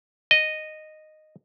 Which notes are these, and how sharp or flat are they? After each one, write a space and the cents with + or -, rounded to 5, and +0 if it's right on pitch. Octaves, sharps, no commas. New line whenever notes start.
D#5 -10